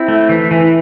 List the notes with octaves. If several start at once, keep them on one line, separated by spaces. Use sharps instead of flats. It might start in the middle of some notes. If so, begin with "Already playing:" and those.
Already playing: C4 E4
A3
E3
E3